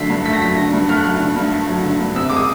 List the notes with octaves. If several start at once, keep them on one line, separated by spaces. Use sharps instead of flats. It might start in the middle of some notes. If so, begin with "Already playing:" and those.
Already playing: D3 F#3 A3 B6 C7
G2
A3 B6
A#6
F#3 B6
D3 A#6
G2
A3 F6
F#6
F#3 F6
D3
G2
A3
F#3
D3
G2
C3 E6
G#3 D6
D#6